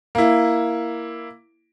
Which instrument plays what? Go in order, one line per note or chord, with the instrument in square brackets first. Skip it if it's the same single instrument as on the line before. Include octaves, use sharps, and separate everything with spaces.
[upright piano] A#3 E4